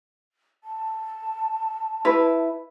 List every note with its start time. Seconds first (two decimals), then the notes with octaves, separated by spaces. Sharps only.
0.64 A5
2.05 E4 B4